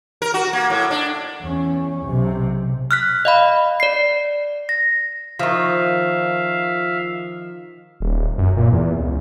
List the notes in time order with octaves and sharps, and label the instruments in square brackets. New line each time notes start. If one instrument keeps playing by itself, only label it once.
[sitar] A#4
F#4
A#3
A2
D4
[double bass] E2 C#4
B1 C3
[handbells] F6 F#6 B6
D#5 F5 B5
D5 C7
A#6
[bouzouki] D#3 F3 [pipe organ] E5 F5
[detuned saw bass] D#1
F#2
A#2
E2
C#2